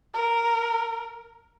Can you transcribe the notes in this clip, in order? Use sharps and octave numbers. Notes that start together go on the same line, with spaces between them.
A#4